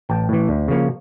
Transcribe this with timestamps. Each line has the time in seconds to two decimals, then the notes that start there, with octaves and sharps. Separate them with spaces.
0.09 A1 G5 A5
0.29 A2 E3
0.49 D2
0.68 C#3 F3 A#3 C#4